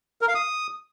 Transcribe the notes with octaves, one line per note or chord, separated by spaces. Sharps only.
A#4
F5
D#6